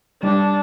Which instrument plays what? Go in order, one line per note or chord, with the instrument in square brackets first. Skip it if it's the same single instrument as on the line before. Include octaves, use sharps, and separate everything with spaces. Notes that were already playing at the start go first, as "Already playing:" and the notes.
[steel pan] G3 [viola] D4